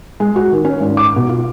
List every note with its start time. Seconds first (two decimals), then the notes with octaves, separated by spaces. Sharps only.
0.20 G#3
0.36 F#4
0.52 D#3
0.65 C#4
0.80 G#1
0.97 D6
1.16 B2
1.29 F4